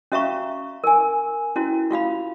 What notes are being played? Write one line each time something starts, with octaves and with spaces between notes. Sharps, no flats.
C#4 F#4 E5 F5 A#5 C#6
A#4 G#5
C#4 E4 F#4
F4 F#4 F5 B5